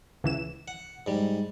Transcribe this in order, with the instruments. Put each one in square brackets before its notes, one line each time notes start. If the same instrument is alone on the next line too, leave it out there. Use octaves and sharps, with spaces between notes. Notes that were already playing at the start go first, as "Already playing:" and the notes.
[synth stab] C#2 E3 E7
[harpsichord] F#5
G#2 G3